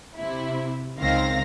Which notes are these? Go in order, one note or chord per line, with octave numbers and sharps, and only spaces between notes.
C3 E4
C#2 D#3 C4 F5 A#6